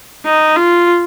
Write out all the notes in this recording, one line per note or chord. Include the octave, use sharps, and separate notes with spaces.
D#4
F4